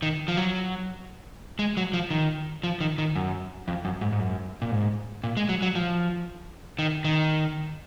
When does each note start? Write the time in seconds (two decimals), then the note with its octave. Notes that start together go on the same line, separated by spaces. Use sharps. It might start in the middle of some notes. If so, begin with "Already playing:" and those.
0.02 D#3
0.28 F3
0.37 F#3
1.59 G#3
1.77 F#3
1.93 F3
2.11 D#3
2.63 F3
2.81 D#3
2.98 D#3
3.16 F#2
3.68 F2
3.85 F#2
4.01 G#2
4.13 G#2
4.19 F#2
4.62 A#2
4.71 G#2
5.24 A#2
5.37 G#3
5.49 F#3
5.62 F#3
5.75 F3
6.79 D#3
7.05 D#3